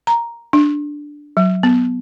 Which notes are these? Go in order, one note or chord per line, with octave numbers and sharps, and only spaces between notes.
A#5
D4
F#3
B3